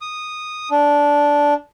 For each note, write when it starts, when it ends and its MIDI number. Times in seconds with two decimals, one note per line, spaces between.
0.01 0.69 87
0.71 1.54 62